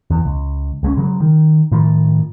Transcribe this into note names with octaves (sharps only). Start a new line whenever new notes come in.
E2
C#2
C#2 G#3 A3 C#4
C#3 F#3 G#3
D#3
A2 D#3 F3